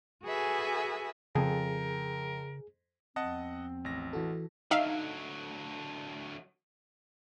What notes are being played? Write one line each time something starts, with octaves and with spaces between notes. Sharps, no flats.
F#4 G#4 A4 B4 E5 G#5
F2 C#3 G#4 A#4 A5
E2 F3 C4 D#5 F#5 A5
A1 A#6
E3 F#4 A4
D3 F#3 D#4 E5 F5